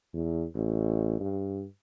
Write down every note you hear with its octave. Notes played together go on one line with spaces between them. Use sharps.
E2
A1
G2